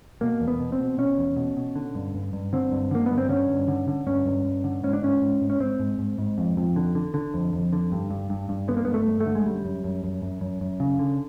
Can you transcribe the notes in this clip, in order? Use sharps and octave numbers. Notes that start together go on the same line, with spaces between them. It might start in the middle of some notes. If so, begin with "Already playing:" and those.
B2 A#3
E2
B3
B2
C4
B2
B2 C#4
E2
B2
B2
D3
G2
G2
G2
D3 C4
G2
D3 A#3
G2 B3
C4
D3 C#4
G2
D3
D3
G2 C#4
G2
G2
D3
G#2 C#4
D4
G#2 C#4
G#2
G#2
C#4
G#2 C4
G#2
G#2
G#2
F2
F2
D3
D3
D3
F2
F2
D3
G2
G2
G2
G2
D3 B3
A#3
G2 B3
A3
G2
A3
D3
G#3
F#2 G3
F#2
F#2
F#2
F#2
F#2
F#2
C#3
D3